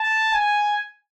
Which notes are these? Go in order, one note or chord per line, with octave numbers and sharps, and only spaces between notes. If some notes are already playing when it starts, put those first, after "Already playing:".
Already playing: A5
G#5